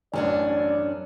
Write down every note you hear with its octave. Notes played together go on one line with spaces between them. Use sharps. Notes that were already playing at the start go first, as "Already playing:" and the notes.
A1 F#2 C#4 D4 D5